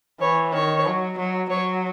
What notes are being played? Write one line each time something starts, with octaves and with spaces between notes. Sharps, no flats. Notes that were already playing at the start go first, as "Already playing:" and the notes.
E3 C#5
D#3 C#5
F#3
F#3
F#3 C#5